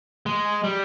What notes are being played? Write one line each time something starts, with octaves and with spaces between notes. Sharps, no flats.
G#3
G3